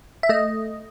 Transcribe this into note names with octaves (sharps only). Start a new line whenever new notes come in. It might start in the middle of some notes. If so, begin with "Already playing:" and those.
E5
A3 D#5